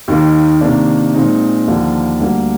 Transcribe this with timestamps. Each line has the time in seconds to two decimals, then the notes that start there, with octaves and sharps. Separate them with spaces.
0.08 D#2 D#3 A#3 D#4
0.61 C3 D#3 A#3 D4
1.14 A#2 G#3 C4 D#4
1.67 D#2 D3 F3 A#3 D4
2.20 D2 D3 G3 A#3